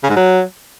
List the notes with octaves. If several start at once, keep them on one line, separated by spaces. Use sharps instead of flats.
C#3
G#2
F#3